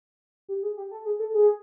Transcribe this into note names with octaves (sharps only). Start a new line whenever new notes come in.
G4
G#4
G4
A4
G#4
A4
G#4